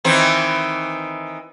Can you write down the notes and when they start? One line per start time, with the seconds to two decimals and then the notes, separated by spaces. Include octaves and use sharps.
0.04 D#3 E3 C4